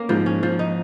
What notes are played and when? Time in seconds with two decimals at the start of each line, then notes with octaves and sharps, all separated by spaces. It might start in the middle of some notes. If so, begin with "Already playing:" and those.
Already playing: A#3 C#4
0.09 G#2 F3
0.26 C#4
0.43 F3
0.59 D#4